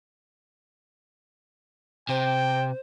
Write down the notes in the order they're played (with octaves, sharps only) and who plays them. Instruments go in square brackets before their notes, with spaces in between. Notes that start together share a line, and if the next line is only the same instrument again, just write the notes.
[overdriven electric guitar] C3 [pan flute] C5 [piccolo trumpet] G5